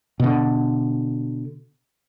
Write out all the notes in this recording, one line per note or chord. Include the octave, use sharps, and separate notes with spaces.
B2 D3